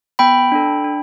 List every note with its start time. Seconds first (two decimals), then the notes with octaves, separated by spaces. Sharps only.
0.19 B3 G5 B5
0.52 D4 A4
0.85 D4